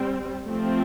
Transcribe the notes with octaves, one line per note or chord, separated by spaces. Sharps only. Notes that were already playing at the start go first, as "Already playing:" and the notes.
Already playing: G3 C4
F3 A3 C4